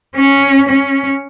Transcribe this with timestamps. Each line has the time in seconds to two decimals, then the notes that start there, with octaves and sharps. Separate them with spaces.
0.16 C#4
0.68 C#4